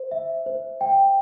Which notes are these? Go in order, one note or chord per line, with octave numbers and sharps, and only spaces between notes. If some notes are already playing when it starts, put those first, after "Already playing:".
Already playing: C5
E5
C5
G5